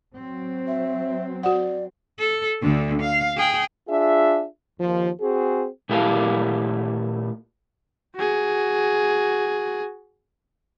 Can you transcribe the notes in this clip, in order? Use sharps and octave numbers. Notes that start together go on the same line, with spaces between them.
F#3 C4
E5
F#4 D5 F#5
A4
D2 D3
F5
G#4 G5
D4 F4 G#4 E5
D#2 F3
C4 F#4 G#4
A#2 A3 E4 G4 F5 A5
F#4 G#4